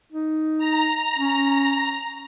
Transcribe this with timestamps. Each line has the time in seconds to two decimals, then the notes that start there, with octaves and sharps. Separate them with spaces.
0.12 D#4
0.58 A#5
1.18 C#4